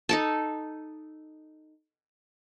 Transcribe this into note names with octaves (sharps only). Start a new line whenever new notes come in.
D#4 A4 A5